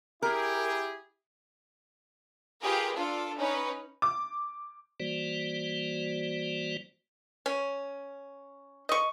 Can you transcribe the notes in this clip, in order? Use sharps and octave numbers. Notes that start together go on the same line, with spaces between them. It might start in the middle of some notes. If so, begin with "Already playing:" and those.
E4 G4 G#4 A#4
F4 G4 G#4 A#4 B4
D4 F4 A4
C#4 D#4 B4
D6
E3 G3 A#3 F#4 C5 D5
C#4
D#5 C#6